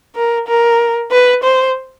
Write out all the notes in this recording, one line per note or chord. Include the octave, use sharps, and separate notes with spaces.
A#4
A#4
B4
C5